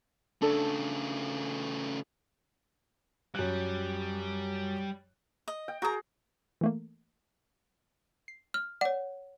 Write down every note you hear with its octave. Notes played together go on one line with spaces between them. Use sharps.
C#3 A3 D4 A4
F#2 G3 F#6
D#5
G5
F#4 G#4 A#4 A#5
E3 A3 A#3
C7
F6
C#5 D5 F#5